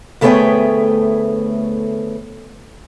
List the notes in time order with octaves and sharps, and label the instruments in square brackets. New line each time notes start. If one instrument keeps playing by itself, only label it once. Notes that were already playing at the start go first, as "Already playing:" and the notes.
[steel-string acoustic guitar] D2 A3 B3 G#4 C#5 G5